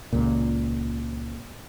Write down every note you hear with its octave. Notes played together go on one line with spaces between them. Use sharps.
C#2 A#2